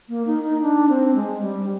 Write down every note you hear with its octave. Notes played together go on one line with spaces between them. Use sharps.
A#3
D#4
D#4
D4
C4
G#3
G3